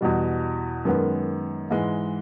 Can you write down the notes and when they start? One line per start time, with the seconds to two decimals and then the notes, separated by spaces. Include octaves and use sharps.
0.01 E2 B2 G3
0.85 F#2 D#3 G#3 B3
1.70 G#2 E3 G#3